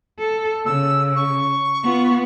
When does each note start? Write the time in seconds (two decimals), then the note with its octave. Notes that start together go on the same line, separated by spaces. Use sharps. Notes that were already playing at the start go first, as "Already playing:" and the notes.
0.19 A4
0.65 C#3 E6
1.16 C#6
1.83 B3 F4